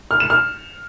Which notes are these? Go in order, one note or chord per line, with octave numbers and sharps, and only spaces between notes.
F6
E7
F6